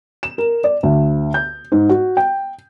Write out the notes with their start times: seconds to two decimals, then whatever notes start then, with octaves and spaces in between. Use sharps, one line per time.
0.23 E7
0.38 A#4
0.64 D5
0.83 D2
1.34 G6
1.72 G#2
1.89 F#4
2.17 G5